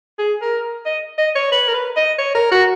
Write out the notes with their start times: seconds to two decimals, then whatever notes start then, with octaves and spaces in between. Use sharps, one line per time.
0.18 G#4
0.42 A#4
0.85 D#5
1.18 D#5
1.35 C#5
1.52 B4
1.68 A#4
1.74 B4
1.96 D#5
2.18 C#5
2.35 A#4
2.51 F#4